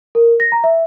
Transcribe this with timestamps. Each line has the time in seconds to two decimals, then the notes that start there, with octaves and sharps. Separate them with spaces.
0.15 A#4
0.40 A#6
0.52 A#5
0.64 E5